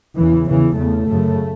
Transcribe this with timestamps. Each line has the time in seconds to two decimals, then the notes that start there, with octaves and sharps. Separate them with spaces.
0.17 E2 C#3 E3
0.46 E2 C#3 E3
0.76 E2 C#3 A3
1.06 F#2 C#3